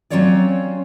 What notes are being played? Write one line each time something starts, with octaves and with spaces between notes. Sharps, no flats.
F#3 C4 C#4 F4 C#5 D5